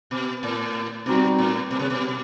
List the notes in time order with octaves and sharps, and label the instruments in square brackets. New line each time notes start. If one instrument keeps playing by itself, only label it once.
[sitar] B2
A2
[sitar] B2 [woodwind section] G3 C4 D#4 F#4
[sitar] A2
B2
C3
B2